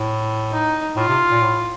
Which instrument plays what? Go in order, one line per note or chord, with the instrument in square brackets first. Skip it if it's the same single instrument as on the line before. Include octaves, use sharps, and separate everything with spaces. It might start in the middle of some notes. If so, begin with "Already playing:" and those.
Already playing: [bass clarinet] A2
[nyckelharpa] D#4
[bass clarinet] A2 [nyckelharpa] F4
[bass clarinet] C3
A#2
A2